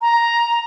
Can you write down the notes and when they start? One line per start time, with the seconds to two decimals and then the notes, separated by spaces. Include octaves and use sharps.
0.01 A#5